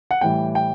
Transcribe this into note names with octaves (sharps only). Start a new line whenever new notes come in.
F#5
A2 E3 G3 G5
G5